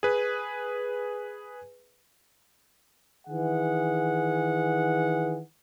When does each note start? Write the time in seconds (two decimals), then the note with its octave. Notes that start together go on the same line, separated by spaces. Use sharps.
0.03 G#4 B4
3.28 D#3 E3 G#4 F#5